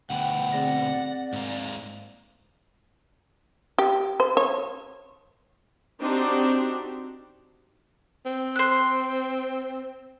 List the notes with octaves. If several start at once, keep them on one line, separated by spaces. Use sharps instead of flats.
D2 B2 F#5 G5
C4 G#4 D5 A#6
G#2 A#3
G4
C5
C#5
C4 D4 D#4 F#4 G4
C4
C5 F#6